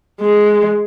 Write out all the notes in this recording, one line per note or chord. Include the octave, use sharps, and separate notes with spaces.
G#3